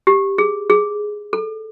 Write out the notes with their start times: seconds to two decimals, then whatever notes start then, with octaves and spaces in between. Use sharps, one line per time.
0.07 G4
0.38 G#4
0.70 G#4
1.33 A4